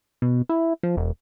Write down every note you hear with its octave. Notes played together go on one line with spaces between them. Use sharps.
B2
E4
F3
E1